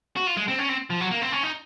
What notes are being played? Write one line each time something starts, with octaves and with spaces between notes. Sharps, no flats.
F#4
F4
G#3
C4
C#4
C4
F3
F#3
A#3
C4
C#4
D#4